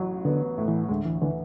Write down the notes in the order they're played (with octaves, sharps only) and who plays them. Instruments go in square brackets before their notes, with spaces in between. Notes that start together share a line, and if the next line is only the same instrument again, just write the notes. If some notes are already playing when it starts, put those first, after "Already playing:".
Already playing: [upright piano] A1 F#3
[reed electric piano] D3 [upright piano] B3
[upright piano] A2
[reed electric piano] E3
[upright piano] D2 [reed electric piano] G#3
[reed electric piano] E3
[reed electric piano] D3 [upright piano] E3